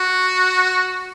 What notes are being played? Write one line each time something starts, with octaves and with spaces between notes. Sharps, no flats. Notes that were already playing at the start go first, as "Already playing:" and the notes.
Already playing: F#4